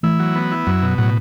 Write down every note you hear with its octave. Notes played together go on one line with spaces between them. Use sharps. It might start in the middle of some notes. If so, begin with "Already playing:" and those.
E3 A3 E4
F#3
B3
E4
F#2 F#3
B2
A2 F#3